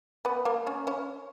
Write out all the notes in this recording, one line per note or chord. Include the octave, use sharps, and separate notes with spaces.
B3 B4
A#3 A#4
C#4 C#5
C#4 C#5